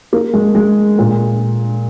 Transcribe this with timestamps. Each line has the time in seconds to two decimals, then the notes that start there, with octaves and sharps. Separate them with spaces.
0.13 A#3
0.34 G#3
0.55 G#3
0.99 A#2